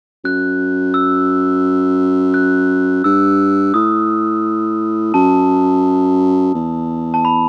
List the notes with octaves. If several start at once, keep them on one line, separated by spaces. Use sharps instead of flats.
F#2 F#6
E6
F#6
G2 E6
A2 D#6
F#2 A5
E2
A5
B5